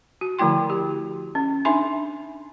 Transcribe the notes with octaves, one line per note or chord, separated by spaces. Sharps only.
F#4
D3 F3 A3 E4 G5 C6
G4
C#4
D4 D#4 E5 G#5 B5 C6